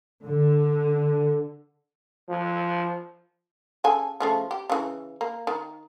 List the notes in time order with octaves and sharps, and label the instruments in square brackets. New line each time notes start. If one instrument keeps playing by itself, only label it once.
[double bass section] D3
[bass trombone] F3
[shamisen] C#3 A4 G#5
C#3 F3 A3
G4
C#3 E3
A#3
D#3